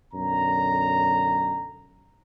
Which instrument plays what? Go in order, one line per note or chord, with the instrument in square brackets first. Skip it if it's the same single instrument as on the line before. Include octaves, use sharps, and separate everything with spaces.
[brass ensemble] B1 F#2 D3 A#5